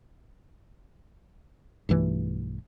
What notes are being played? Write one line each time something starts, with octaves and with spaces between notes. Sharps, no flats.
B1 G2 E3 A3